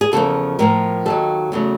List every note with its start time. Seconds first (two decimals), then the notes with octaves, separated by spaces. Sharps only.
0.01 G#4
0.12 E2 C#3 F3 A#3 A4
0.59 A2 F3 A#3 A#4
1.06 D#2 D#3 F#3 A4
1.52 E2 C#3 F#3 A3